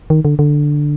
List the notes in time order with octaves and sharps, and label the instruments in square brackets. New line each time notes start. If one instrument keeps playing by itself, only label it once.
[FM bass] D#3
D3
D3